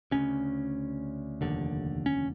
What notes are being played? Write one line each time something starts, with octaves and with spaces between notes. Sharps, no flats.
D2 C#3 C#4
F1 D#2 D3
C#4